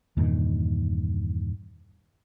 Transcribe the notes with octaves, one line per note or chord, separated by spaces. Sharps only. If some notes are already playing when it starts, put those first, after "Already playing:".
E2 G2 A#2 D#3